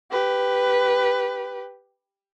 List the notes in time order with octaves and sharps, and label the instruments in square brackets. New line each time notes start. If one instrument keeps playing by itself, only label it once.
[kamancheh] G4 B4